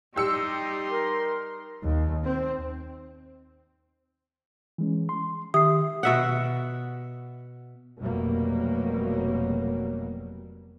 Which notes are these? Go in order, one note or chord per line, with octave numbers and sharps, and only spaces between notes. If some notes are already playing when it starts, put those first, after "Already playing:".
G3 D#4 G4 C6 E6 C#7
A#4
D#2
C4
E3 G#3 C#4
C6
D#3 G4 E5 D#6 C7
B2 E5 F#5
F1 B2 F#3 G3 A#3